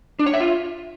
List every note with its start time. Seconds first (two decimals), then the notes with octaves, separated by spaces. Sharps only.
0.19 D4
0.26 C#5
0.33 E5
0.40 F4